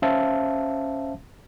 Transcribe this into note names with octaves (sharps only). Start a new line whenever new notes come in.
C#4 C5 E5 F5 A5